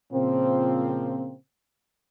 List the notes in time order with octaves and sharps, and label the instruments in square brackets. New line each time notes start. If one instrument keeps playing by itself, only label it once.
[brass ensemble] A#2 C#3 F3 A#3 C4